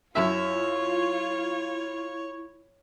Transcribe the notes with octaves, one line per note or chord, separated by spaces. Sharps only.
F#2 E4 F4 C#5 E5